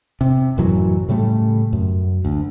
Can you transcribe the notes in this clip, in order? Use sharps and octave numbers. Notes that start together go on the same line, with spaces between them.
C3
A1 F#2 E3 F#3
A2 C#3 G3 A3
F#2
D2